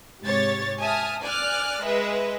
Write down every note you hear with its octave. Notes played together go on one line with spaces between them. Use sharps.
G#2 C3 G4 C#5 A6
E5 G#5 A5 D#6 F6
D5 G#5 D6 F6 F#6
G#3 B4 D#5 E5